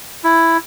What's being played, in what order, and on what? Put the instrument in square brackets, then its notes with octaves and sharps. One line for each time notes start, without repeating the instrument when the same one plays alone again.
[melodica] E4